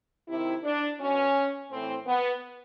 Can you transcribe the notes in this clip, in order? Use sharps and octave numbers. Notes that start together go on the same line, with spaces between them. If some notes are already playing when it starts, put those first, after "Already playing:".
C3 D#3 E4
D4
B2 C#4
A2 E3 C4
B3